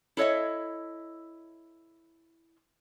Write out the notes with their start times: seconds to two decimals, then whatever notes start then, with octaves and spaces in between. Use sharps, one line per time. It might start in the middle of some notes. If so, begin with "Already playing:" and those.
0.17 E4 A4 C#5 D#5 E5